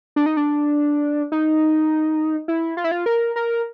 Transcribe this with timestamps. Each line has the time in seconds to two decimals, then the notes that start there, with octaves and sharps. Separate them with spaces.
0.16 D4
0.26 D#4
0.37 D4
1.32 D#4
2.48 E4
2.77 F4
2.84 E4
2.91 F4
3.06 A#4
3.36 A#4